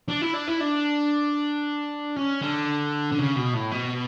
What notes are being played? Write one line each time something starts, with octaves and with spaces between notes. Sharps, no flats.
D4
E4
D4
E4
D4
C#4
D3
D3
C#3
B2
A2
B2